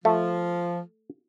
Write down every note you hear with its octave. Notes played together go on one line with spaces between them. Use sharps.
F3 A3